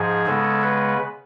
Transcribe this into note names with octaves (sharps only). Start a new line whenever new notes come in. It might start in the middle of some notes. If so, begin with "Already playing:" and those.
Already playing: G#2 F3 G#4
C#3 G#3 B3 A4
B4